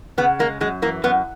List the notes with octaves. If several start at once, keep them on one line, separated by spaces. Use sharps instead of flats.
C#3 B3
G#3 A#3
F#2 G#3
E3 A#3
F#2 B3